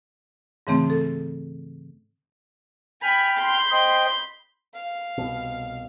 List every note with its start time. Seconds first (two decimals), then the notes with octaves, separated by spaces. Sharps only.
0.67 G#2 C#3 E3 A3 C4
0.90 A4
3.02 G5 G#5 B5 F6
3.38 B5 C6 G6
3.71 C5 D#5 G5
4.74 F5
5.18 C2 B2